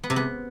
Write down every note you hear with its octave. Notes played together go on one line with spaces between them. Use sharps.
B3
C3
B3